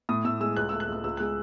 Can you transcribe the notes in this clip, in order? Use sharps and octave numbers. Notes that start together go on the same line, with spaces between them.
A2 D#6
A2 E6
G#3 E6
C#2 F#6
A3 E6
F#6
C#2 E6
C#2 E6
G#3 F#6